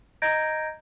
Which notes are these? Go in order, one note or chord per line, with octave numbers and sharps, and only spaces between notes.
D#5 A#5 G6 G#6 A#6 D7